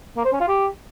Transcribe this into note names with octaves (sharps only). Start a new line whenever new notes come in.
A#3
C5
C#4
F4
G4